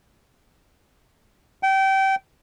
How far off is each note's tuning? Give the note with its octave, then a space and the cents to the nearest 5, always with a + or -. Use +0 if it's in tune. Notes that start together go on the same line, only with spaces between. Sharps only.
G5 -25